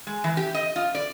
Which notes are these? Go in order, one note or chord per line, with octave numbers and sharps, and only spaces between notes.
G#3
E3
G4
D#5
F4
D5